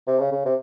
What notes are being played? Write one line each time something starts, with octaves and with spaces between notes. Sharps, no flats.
C3
C#3
C#3
C3